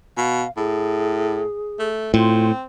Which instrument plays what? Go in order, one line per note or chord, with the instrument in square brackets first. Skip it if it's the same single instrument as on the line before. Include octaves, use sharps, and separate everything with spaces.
[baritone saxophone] B2 [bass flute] F5
[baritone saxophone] A2 [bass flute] G#4
[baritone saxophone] A3
[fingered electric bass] A2 [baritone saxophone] C4 [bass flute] F4